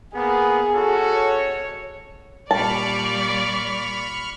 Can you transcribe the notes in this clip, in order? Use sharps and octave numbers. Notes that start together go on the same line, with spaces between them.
A#3 B3 G#4
C#4 F#4 A4
C#5
A#2 G3 D5 A5 B5 C#6 F6